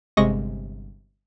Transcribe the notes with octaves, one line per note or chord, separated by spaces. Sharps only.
G1 C3 G#3 D#5 C#6 A#6